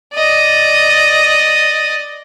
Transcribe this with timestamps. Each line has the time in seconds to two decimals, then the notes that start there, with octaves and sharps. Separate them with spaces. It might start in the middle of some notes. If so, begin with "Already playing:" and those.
0.15 D5 D#5